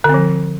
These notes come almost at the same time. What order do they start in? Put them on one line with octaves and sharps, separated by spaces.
D3 C4 F3